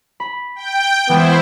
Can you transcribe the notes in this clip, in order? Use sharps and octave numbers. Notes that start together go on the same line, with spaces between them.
B5
G5
E3 G#3 B3 E4 C5